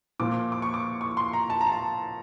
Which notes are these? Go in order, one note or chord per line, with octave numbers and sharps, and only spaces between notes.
A#2 F3 D6
D6
C#6
D6
C#6
C6
A#5
A5
A#5
A5